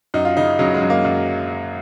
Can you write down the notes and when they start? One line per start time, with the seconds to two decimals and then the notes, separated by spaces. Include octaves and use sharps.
0.14 F#2 D#4
0.25 F4
0.37 C#3 D#4
0.59 C#3 F#3
0.74 G#3
0.82 F#2
0.90 A#3
1.05 F#2